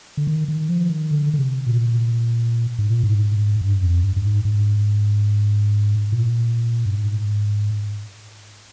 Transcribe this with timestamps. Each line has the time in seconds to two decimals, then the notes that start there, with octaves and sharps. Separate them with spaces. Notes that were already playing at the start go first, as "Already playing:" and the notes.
0.17 D3
0.27 D#3
0.48 D#3
0.69 F3
0.90 D#3
1.11 D3
1.34 D3
1.39 C3
1.66 A#2
2.79 G#2
2.90 A#2
3.03 G#2
3.61 G2
3.82 F2
4.04 G2
4.16 G2
4.25 G#2
4.45 G#2
6.12 A#2
6.85 G2
6.95 G#2